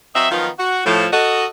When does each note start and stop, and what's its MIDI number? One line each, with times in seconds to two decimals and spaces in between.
0.16 0.29 54
0.16 0.29 60
0.16 0.29 75
0.16 0.29 76
0.31 0.49 51
0.31 0.49 53
0.31 0.49 54
0.31 0.49 59
0.31 0.49 63
0.31 0.49 65
0.59 0.86 66
0.86 1.07 45
0.86 1.07 53
1.12 1.46 66
1.12 1.46 69
1.12 1.46 75